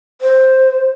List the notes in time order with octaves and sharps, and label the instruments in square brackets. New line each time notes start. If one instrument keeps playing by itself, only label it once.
[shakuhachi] C5